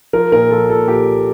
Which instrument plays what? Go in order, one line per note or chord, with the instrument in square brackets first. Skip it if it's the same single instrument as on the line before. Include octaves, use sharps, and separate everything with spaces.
[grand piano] F3 A#4
A#2 A#4
F3 A4
A#2 A4
A#2 G4